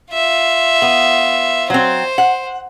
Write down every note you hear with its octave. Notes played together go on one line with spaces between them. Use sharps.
F4 E5
B3
F#3 C4 C5
F#5